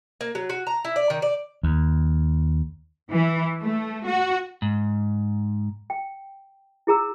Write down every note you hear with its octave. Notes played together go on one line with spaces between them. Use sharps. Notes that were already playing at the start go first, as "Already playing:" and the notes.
A#3
F#3
F#4
A#5
E4
D5
D#3
D5
D#2
E3
A3
F#4
G#2
G5
E4 G#4 A#5 E6